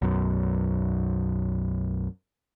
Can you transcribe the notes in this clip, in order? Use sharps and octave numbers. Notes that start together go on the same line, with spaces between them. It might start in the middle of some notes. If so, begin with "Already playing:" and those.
B1 F#2